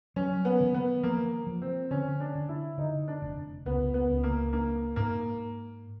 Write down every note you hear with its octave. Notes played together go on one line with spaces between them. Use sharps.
F#3 C#4
B3
D#3
B3
F3 A#3
F3
C4
D3 C#4
D4
D3
E4
D3 D#4
D4
F1
C#2 B3
B3
C#2
A#3
A#3 D4
G#2 A#3